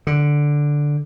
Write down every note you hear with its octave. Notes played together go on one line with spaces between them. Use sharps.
D3